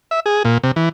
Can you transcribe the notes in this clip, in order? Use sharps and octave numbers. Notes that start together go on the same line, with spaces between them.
E5
G#4
A#2
C3
E3